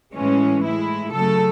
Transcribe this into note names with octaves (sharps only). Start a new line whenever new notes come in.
A2 E3 G#3 C#4
A2 G#3 E4
C#3 F#3 A3 A4